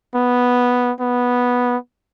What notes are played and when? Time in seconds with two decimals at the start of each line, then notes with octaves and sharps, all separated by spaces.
0.15 B3
1.00 B3